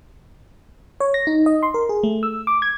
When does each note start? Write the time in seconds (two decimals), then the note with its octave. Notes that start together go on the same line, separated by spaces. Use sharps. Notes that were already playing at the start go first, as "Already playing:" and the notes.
1.00 C#5
1.14 A#6
1.27 D#4
1.46 D#5
1.63 C6
1.74 A#4
1.89 G#4
2.03 A3
2.23 E6
2.47 D6
2.62 G#6